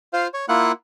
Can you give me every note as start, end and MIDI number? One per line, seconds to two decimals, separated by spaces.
0.13 0.28 65
0.13 0.28 72
0.13 0.28 77
0.34 0.46 73
0.49 0.72 58
0.49 0.72 64
0.49 0.72 65
0.49 0.72 78
0.49 0.72 90